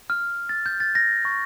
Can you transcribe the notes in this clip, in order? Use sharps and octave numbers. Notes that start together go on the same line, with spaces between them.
F6
A6
G6
A6
A#6
C#6